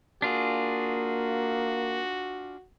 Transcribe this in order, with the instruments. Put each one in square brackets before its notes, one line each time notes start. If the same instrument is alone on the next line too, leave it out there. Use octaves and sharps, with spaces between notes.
[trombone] A#3 [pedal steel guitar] D4 F4 G#4 [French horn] F#4